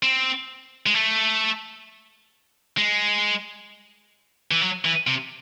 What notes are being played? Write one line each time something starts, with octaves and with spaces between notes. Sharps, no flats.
C4
G#3
A3
G#3
E3
F#3
E3
C3